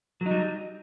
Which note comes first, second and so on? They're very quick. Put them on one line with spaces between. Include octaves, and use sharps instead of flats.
F#3 D#4 G3